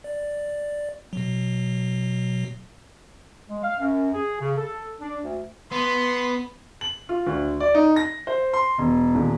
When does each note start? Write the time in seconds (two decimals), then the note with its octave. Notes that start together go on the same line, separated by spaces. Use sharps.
0.04 D5
1.13 B2 F#3
3.48 G#3
3.63 F5
3.79 F#2
4.14 G#4
4.41 C#3
4.57 A4
5.00 D4
5.23 D2
5.72 B3 C6
6.81 F#7
7.09 F4
7.27 D2
7.60 D5
7.75 D#4
7.96 A#6
8.27 C5
8.53 C6
8.78 E1
9.15 D#1